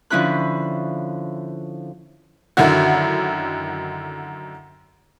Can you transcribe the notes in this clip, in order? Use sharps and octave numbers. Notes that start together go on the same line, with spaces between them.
D3 F3 C#4 E4 B5 F#6
F#2 D3 D#3 E4 F#4